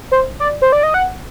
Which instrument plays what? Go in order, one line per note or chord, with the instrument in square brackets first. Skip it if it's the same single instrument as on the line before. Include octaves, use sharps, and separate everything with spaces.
[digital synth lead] C5
D5
C5
D5
D#5
F#5